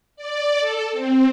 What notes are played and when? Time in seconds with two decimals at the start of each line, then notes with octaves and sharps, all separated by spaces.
0.16 D5
0.60 A4
0.92 C4